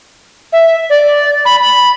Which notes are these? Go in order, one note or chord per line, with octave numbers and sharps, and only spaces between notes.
E5
D5
B5
B5